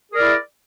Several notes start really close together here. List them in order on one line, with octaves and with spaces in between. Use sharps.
G#4 A#4 D5 E4